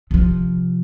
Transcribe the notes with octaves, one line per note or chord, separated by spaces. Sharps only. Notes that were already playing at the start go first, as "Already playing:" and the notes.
C3 F3